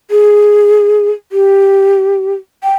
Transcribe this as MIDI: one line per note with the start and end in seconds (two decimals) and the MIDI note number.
0.11 1.10 68
1.32 2.33 67
2.63 2.75 79